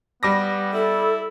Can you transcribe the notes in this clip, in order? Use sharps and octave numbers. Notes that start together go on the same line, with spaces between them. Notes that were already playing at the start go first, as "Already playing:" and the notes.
G3 B3 D6 A#6
E4 A4